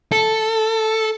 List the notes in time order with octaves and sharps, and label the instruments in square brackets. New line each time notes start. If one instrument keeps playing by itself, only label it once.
[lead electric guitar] A4